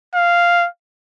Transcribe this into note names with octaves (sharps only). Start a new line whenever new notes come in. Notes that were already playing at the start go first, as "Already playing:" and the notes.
F5